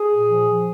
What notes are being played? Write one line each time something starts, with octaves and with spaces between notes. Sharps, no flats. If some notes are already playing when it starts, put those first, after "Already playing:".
Already playing: G#4
A#2
F3
F3